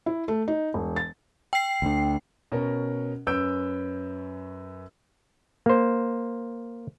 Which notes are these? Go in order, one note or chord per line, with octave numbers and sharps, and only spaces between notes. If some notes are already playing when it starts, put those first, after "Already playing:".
E4
A3
D#4
E1
A6
G5 C7
D2 D3
B2 C#4 A#4
F#2 C#4 B4 E6 G6 D7
A#3 C5